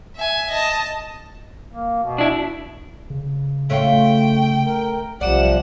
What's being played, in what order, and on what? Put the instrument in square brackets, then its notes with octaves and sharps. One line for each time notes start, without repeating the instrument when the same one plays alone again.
[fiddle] E5 G#5
D#5 A5
[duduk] A#3
B2
[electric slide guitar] D4 E4
[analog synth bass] C#3
[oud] A3 C#4 F4 [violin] G5
[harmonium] A#4
[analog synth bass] B1 [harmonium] C3 F3 G3 [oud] D5 [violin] F#5 E7